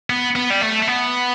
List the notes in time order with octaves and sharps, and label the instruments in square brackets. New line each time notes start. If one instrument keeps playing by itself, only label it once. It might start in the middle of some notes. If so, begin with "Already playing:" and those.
[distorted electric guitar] B3
B3
G3
A3
A3
B3